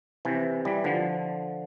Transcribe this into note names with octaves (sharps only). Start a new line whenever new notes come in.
C3 E3
E3 G3
D3 F3